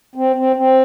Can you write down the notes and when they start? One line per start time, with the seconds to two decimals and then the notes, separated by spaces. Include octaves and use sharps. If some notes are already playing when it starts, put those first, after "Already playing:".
0.16 C4
0.36 C4
0.56 C4